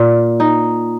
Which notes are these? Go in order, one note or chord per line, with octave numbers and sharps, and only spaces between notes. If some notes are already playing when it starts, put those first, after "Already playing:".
Already playing: A#2
D#4